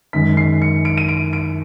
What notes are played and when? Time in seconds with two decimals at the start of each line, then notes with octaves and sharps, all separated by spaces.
0.13 F#2 D#3 G#3 B6
0.37 C7
0.62 C#7
0.85 D7
0.98 D#7
1.09 D7
1.33 D7